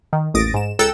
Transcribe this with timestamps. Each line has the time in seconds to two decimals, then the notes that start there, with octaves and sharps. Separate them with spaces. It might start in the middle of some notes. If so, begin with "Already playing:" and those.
0.13 D#3
0.34 A1 D#2 D#6 A6 A#6 D7
0.54 G#2 E7
0.79 C#2 A4 G5 A#5 E6 F#6